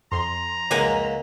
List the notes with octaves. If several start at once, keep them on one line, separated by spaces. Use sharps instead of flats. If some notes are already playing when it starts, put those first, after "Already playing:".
F2 A#5 C6
C#2 A#3 F#5 G#5